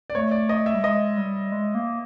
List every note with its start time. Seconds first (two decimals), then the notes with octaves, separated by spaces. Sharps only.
0.10 D5
0.15 A3 C#5
0.31 D5
0.49 D#5
0.66 E5
0.74 G3
0.83 G#3 D#5
1.17 G3
1.52 G#3
1.75 A#3